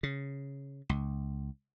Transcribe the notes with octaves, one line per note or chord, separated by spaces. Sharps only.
C#3
C#2